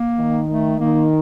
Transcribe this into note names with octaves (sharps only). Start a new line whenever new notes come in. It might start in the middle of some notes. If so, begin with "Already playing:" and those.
Already playing: A#3
D#3
A3
D#3 A#3